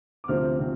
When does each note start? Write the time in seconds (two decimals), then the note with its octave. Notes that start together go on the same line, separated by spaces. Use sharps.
0.24 D6
0.28 D2 C3 F3 C4 F6
0.58 C3 F3 C4